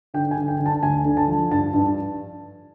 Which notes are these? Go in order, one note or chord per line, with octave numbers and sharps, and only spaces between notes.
D3 G5
G#5
D3
G5
D3
A5
D2 G#5
D3
A5
F3
G2 A5
G2